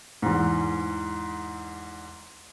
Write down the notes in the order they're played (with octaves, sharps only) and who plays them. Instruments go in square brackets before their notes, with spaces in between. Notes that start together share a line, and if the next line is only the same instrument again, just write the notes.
[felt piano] E2 G#2